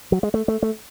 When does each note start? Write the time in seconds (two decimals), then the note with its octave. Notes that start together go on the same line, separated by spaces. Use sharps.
0.12 F#3
0.23 G#3
0.34 A3
0.48 A3
0.63 A3